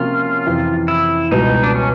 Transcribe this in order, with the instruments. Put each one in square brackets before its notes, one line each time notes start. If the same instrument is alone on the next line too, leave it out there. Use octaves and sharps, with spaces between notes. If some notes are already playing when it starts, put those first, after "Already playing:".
Already playing: [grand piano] C3 F3 A#3 C#4 F#4 [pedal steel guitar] F4
[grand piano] F2 C3 E3
[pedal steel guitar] E4
[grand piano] C#2 B2 G3 [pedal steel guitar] D#4
[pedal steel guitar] D4
C#4